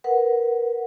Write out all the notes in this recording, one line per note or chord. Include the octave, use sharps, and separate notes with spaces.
A#4 B4 F#5